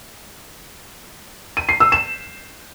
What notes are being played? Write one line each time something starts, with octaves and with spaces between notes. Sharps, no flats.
D#7
C7
E6
E7